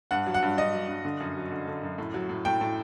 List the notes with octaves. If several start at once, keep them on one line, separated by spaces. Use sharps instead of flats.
G2 F#5
F#3
F#5
G2
G2 D#5
F#3
G2
D3
F#2
F#3
D3
D3
F#2
A2
F#3
A2
A2 G5
A2